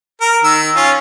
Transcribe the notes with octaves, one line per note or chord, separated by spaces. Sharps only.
A#4
D#3 E6
C#4 F4